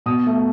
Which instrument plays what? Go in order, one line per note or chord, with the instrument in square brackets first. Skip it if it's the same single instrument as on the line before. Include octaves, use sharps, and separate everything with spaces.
[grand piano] B2 D#6
A3